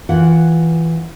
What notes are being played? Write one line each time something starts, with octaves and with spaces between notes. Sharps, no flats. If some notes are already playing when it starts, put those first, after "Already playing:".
E3 F4 F#5